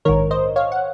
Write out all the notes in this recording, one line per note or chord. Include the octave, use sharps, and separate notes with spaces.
A#1 G#2 D#3 A#4 C#5
C5 D#5
C#5 F5
F#5